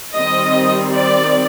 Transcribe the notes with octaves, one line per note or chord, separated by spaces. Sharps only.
D#3 G3 C4 D#5
D5